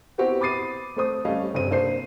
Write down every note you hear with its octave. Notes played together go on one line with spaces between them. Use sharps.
B3 C4 E4 F#4 G4 C5
B5 D6 D#6 A6 C7 D#7
A3 C4 C5 D#6
G3 A3 C#4 D#5 F5
F1 G2 C4 D#7
A#3 D4 C5 C7